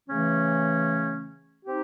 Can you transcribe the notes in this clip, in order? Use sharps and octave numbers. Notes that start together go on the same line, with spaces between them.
C#3 E3 A3 C#4
C4 D#4 G4